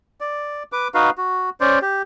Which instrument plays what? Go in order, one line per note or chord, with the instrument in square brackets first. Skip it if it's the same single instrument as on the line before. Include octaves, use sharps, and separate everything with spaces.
[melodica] D5
B4 D6
D#4 F#4 B4 F5
F#4
C#4 C5 D5
G4